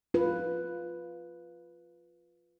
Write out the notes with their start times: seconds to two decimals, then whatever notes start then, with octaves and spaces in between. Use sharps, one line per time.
0.14 F4 B4